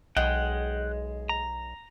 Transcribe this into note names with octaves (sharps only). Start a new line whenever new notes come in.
B1 G#3 F#5 G5
A#5